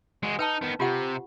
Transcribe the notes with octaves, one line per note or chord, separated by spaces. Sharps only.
G#3 F#4
D#4 B4 G5 A5
D#3 B3
C3 F4 G4 F#5